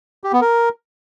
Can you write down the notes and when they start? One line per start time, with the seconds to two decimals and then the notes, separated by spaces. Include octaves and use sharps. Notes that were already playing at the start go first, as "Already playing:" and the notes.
0.24 G4
0.33 B3
0.41 A#4